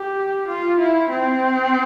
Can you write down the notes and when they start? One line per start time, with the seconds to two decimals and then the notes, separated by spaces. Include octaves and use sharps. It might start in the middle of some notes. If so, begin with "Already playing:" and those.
Already playing: G4
0.48 F4
0.79 E4
1.10 C4